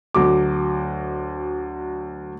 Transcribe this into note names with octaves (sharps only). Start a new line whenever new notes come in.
D2 F#3 D6